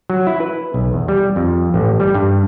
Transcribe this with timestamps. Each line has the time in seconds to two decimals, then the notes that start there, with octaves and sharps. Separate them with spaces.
0.10 F#3
0.27 E4
0.40 B4
0.74 B1
0.93 E2
1.08 G3
1.36 F2
1.74 A1
2.00 G3
2.14 G2